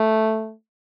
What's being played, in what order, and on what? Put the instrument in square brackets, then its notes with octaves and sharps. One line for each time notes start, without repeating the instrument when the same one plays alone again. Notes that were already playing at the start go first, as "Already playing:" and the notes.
Already playing: [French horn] A3